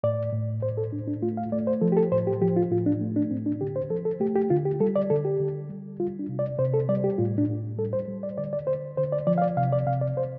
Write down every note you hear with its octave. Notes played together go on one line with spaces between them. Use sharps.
A2 D5
A2
A2 C5
A4
A2 D4
D4
A3 F4
F5
A3 D5
C5
F3 A4
G4
A4
A2 C5
G4
F3 G4
F4
A2 F4
D4
A3
D4
A2 C4
D4
D3 G4
C5
F3 A4
A4
A3 G4
G4
D3 F4
G4
G3 A4
D5
D3 A4
G4
D3
G3
G3 F4
D4
C3
D5
C3 C5
A4
G3 D5
G4
A2 F4
D4
A2
G3 A4
C5
G3
D5
D3 D5
D5
D3 C5
D3 C5
D5
F3 D5
F5
D5
C3 F5
D5
C3 F5
D5
C3 C5